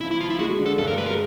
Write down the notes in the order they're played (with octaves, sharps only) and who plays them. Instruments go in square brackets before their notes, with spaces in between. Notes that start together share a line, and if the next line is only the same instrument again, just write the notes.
[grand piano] F3 [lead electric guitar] E4
[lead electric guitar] E4
[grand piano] F3 [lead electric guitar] F4
[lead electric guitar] E4
[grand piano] G#3 [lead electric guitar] F#4
[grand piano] D3
[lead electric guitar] A4
[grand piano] G2 [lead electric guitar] A4
[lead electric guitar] A#4
[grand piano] G#3 [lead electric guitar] B4
[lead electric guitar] A#4